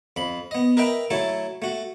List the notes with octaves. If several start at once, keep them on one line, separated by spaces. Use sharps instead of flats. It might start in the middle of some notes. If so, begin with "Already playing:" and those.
F2 B5
B3 D#5
A#4 B4 D#5 E5 G5 A#5
F#3 A3 E4 A4
A3 F#4